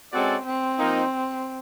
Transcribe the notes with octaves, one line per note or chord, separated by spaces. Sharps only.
G#3 C4 C#4 F#4 A4 D5
C4
F3 A#3 D#4